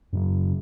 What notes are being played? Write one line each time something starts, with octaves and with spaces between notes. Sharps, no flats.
F#2 C#3 F#3